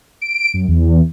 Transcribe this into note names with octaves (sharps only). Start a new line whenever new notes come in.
D7
F#2
E2